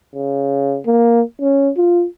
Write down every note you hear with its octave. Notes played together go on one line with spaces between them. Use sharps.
C#3
A#3
C#4
F4